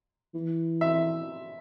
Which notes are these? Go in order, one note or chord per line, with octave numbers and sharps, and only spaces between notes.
E3
E5